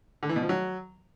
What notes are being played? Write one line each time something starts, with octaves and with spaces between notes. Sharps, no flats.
D3
E3
B2
F3
F#3